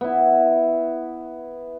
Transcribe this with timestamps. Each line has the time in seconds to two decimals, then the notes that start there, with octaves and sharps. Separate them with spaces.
0.01 B3 E4